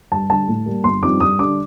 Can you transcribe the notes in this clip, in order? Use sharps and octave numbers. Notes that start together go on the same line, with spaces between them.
G2 A5
D3 G3 A5
A2
G3 A#3
G1 C6
G2 F3 C4 D#4 D6
G2 D#6
D3 G3 D4 D6